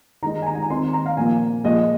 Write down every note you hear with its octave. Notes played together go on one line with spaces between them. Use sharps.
D#3 G#3 D#4 A#5
G#5
A#5
G#5
A#5
D#3 C4 D#4 C6
A#5
F5
A#2 F3 A#3 G#5
A#2 F3 G#3 D#5